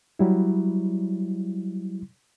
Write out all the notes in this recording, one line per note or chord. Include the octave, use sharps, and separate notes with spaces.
F#3 G3 E4